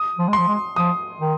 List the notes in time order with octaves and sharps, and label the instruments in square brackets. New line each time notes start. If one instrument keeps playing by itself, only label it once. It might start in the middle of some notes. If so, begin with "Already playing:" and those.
Already playing: [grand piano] D#6
[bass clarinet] F3
G#3
[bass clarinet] F3 [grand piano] C6
[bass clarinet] G#3
[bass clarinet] F3 [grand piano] D#6
[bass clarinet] D#3